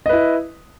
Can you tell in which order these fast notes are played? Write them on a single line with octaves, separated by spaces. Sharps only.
D#5 B4 E4